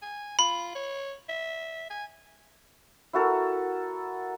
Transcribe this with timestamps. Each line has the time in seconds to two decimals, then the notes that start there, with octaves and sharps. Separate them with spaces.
0.02 G#5
0.39 F4 B5
0.75 C#5
1.29 E5
1.90 G#5
3.13 E4 F#4 A4 A#4